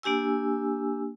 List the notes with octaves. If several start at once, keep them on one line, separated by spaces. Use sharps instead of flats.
A#3 D4 G4 G#5 E6